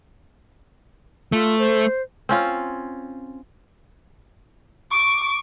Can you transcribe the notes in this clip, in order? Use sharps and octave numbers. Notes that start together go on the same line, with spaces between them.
A3 F4
C5
C4 C#4 F4
C#6 D6